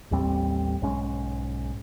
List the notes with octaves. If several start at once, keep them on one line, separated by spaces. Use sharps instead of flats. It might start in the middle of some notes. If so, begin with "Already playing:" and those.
A1 D#2 G3 C4
B1 G#2 G#3 C#4